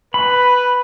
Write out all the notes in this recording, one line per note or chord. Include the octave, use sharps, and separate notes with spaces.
B4 B5